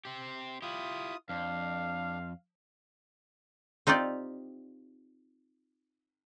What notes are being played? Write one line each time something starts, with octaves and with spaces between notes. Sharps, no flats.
C4 G4
E4 F4 G4 D#6
F2 D4 F5
C4 D#4 F4 G4 D5